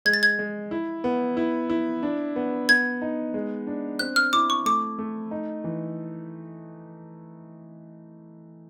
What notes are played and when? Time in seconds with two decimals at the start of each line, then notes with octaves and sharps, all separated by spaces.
0.06 G#3 G#6
0.14 A6
0.23 G#6
0.39 G#3
0.71 E4
1.04 B3
1.37 E4
1.70 E4
2.03 D4
2.36 B3
2.69 B3 G#6
3.02 D#4
3.34 G#3
3.67 D4
3.99 C4 F#6
4.16 F6
4.33 E4 D6
4.50 C#6
4.66 A3 D6
4.99 A3
5.31 D#4
5.64 E3